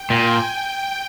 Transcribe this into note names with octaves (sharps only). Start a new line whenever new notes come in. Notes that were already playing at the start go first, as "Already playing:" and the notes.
Already playing: G5
A#2 G#5
G5
G5